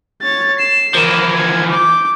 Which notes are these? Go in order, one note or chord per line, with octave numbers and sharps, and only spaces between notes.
C#5 A6
C7 E7
E3 F3 A#4
G#6
D6 G6